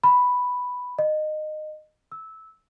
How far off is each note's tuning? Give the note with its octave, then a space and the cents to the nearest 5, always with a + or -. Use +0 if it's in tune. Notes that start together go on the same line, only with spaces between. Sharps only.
B5 +0
D#5 -20
E6 -15